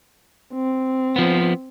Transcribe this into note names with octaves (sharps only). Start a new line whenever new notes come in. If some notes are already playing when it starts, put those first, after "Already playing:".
C4
F3 B3